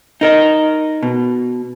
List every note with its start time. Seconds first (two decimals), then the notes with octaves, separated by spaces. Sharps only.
0.21 D#4 A#4 D#5
1.03 B2